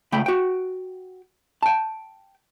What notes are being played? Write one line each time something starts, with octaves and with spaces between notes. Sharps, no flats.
C#2 A3 G5 B5
F#4 G5
G5 A5